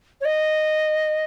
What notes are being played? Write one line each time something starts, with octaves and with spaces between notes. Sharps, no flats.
C#5
D#5